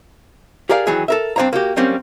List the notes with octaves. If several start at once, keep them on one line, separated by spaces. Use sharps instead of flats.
G4 G#4 A#4 D5 F5
D#3 E3 F#3 G#4
A4 A#4 E5
G2 C4 D4 C#5 F5 A#5
A#3 F#4 G4
F#3 G3 A#3 C4 C#4